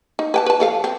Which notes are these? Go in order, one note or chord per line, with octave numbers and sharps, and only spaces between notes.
D#4
B4 G5 A5
B4 A5
F3 A4 F5
C4